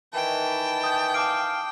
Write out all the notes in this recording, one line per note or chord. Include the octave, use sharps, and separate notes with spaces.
D#3 E3 G5 A5
D#6 G6
F5 A5 D6 D7